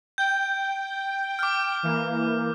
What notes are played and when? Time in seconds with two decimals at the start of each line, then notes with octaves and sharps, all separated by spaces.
0.18 G5 G6
1.39 D6 F6
1.83 E3 A#3